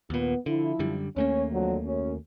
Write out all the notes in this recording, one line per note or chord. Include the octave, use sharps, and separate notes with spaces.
D#2 A#2 B3
D3 F3 E4
F#2 D3 G3
D#2 A3 A#3 C#4
F2 D3 F#3
F#2 C#4